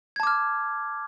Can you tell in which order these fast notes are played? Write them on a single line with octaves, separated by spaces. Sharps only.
G#6 A5 D6 F6